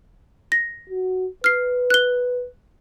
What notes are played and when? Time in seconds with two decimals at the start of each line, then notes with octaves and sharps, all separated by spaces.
0.52 A#6
0.90 F#4
1.44 B4 F6 C7
1.90 F#6 G7